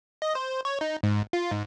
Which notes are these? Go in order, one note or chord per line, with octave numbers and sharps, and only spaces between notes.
D#5
C5
C#5
D#4
G#2
F4
G#2